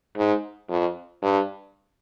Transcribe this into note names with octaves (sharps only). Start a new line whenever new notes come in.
G#2
F2
G2